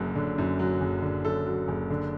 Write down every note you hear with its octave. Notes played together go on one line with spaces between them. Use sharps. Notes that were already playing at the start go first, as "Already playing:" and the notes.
Already playing: F#1 F#2 D3 F#3
D3
F#2
F#3
F#1
D3
F#2 A4
F#3
F#1
D3